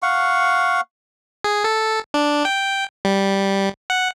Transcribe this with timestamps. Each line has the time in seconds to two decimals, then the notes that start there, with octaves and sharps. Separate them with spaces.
0.03 F5 F#5 C#6
1.44 G#4
1.64 A4
2.14 D4
2.45 G5
3.05 G3
3.90 F#5